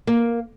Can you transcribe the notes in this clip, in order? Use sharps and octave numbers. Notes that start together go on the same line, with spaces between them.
A#3